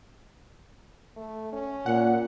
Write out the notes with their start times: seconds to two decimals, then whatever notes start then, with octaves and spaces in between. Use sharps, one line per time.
1.16 A3
1.53 C#4
1.86 A#2 F#5